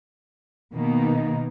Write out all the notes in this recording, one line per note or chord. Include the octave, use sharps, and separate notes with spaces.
B2 D#3 A#3 B3 D#4